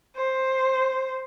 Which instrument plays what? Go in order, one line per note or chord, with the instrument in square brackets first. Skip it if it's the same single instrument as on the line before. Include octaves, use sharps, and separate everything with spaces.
[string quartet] C5